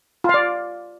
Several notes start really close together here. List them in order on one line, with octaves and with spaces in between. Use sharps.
F4 F5 D5